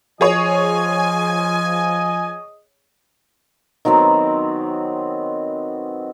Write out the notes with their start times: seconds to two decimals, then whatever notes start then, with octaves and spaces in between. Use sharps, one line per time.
0.21 F3 G#4 C#5 D#5 G#5
3.85 D#3 F#3 B3 C4